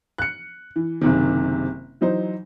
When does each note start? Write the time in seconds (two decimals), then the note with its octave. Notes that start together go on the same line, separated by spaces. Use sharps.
0.18 F#6 C#7
0.76 E3
1.01 F#1 C3 D#3
2.01 E3 F#3 D#4 C5